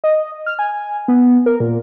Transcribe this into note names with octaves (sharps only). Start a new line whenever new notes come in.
D#5
F6
G#5
B3
A#4
A#2